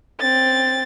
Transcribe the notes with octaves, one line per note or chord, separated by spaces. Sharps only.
C4 A6